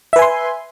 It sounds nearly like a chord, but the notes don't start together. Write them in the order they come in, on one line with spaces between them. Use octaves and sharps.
E5 B4 G#5 C6